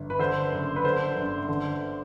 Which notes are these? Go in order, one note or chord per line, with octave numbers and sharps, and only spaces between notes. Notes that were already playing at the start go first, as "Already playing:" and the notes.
Already playing: G1
B4
D3 C5
F#1
B4
D3 C5
G1
D3